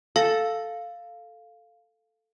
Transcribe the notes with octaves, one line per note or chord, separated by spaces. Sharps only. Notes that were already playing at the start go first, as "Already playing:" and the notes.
A4 F5